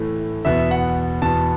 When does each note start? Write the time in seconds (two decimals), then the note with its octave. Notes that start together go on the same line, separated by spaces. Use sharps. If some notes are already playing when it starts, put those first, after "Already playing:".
Already playing: A2 E3 A3
0.45 E2 B2 B3 E5
0.71 F#5
1.22 E2 B2 B3 A5